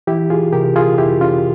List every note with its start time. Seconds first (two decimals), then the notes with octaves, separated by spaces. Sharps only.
0.07 E3 E4 G4
0.30 F4 G#4
0.53 C3 G4 A#4
0.76 F4 G#4
0.98 F2 E4 G4
1.21 C#4 F4